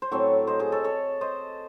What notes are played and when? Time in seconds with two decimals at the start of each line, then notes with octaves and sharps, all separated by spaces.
0.02 C5
0.12 A2 F#3 C4 A4 C#5
0.47 C5 D#5
0.60 G#4 C5
0.72 A4 C#5
0.84 A4 C#5
1.21 C5 D#5